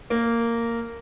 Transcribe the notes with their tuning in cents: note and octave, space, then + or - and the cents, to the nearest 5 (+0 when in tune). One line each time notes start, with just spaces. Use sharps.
A#3 -10